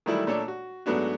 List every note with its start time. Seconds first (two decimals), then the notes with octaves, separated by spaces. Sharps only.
0.06 D#3 E3 F#3 G3 A3 E4
0.27 A#2 A3 D4 A4 C#5 A5
0.48 F#4
0.86 G#2 F#3 A3 B3 D4 F#4